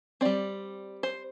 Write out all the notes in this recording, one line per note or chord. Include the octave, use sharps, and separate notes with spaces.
G3 C4 D5
C5